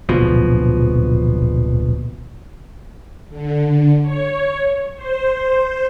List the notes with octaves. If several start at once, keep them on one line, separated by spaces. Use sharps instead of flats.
D1 A#1 B2 F3
D3
C#5
C5